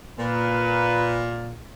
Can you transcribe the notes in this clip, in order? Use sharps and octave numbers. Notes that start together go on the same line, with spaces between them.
A#2 B4